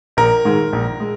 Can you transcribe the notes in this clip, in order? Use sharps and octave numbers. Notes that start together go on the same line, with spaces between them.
A#1 A#4
G#2 D#3 G#3
A#1
G#3